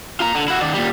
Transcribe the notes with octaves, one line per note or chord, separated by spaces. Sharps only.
F4 A#5
D3
E4 F#4
D#3 D5
A#2 G3